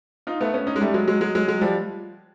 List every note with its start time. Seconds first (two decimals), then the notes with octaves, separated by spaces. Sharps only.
0.27 D#4 F4
0.41 A3 B3
0.54 B3 C#4
0.67 C#4 D#4
0.76 G#3
0.81 G3 A3
0.94 F#3 G#3
1.08 F#3 G#3
1.21 F#3 G#3
1.35 F#3 G#3
1.48 F#3 G#3
1.61 F3 G3